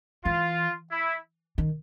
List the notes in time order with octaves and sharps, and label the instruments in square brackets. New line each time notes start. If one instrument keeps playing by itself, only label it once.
[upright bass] E3 [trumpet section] F4
[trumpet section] E4
[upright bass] D#3